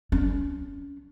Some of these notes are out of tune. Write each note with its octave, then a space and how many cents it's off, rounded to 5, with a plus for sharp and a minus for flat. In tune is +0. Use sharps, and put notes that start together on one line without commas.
C#4 +30